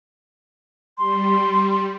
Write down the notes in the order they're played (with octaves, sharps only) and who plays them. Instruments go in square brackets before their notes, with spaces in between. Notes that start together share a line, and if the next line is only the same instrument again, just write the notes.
[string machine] G3 [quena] C6